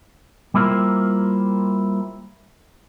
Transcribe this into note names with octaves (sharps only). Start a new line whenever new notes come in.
G3 A#3 E4 F4 A#4 C5